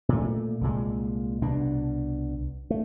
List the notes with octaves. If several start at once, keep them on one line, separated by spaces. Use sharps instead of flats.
A#2 A3
C2 A#2 G#3
C2 B2 D4
A3